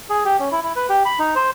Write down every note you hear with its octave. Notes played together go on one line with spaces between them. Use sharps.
G#4
G4
C#4
E4
E4
B4
G4
B5
D#4
C5